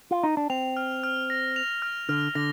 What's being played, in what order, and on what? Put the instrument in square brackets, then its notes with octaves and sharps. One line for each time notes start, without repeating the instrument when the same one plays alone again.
[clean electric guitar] F4
D#4
D4
[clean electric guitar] C4 [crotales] F7
[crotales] F6
F6
A#6
F7
F6
[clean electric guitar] D3 [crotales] F6
[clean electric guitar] D3 [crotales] A#6